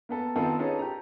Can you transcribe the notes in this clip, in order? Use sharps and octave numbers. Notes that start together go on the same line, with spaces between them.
A#3 B3 A4
D#3 B3 C4 F4 A4
C#4 D#4 F4 G#4 A4 B4
G4 A#5